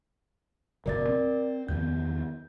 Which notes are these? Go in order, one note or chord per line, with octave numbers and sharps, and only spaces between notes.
F#1 B1 B2 A#4 D5 A6
C4
E2 D#3 B3 G6